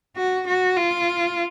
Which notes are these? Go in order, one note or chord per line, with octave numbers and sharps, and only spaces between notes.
F#4
F#4
F4